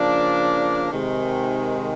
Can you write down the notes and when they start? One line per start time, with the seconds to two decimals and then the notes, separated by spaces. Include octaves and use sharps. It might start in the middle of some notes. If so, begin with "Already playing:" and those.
Already playing: C#3 F3 A#3 D4
0.91 C3 D#3 G#3